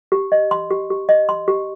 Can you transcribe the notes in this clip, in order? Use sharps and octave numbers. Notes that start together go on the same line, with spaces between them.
G4
D#5
C6
G4
G4
D#5
C6
G4